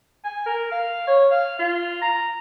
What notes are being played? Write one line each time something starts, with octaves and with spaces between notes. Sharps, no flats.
G#5
A#4
F5
C#5
F5
F4
A#5